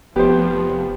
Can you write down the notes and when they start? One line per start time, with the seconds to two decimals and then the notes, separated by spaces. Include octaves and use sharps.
0.16 F1 F3 B3 G4 C5